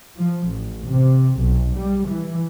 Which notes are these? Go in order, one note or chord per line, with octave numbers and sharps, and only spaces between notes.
F3
A1
C3
B1
G3
E3